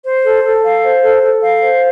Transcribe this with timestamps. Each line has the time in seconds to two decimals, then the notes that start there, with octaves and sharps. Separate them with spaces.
0.05 C5
0.24 A4
0.44 A4
0.63 F5
0.84 C5
1.03 A4
1.23 A4
1.42 F5
1.62 C5